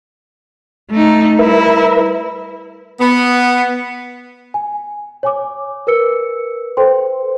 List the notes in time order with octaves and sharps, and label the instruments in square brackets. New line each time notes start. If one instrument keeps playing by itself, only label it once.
[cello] A3 D#4
[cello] G3 E4 [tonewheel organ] A#4 B4 E5
[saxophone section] B3
[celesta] G#5
C#5 G#5 D6
A#4 B4 E6 C#7
A4 B4 C5 G5 C6